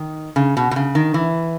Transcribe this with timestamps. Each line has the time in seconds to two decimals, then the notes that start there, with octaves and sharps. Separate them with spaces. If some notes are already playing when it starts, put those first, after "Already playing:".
Already playing: D#3
0.36 C#3
0.57 B2
0.71 B2
0.76 C#3
0.95 D#3
1.14 E3